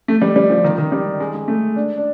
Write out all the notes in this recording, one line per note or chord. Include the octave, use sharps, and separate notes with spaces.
A3
G3
G3
F3
D#3
D#3
G3
G#3
G#3
A3
D4
D4